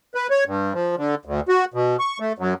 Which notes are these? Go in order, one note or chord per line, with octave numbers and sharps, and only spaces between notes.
B4
C#5
G2
F3
D3
D2
F#4
B2
C#6
A3
F#2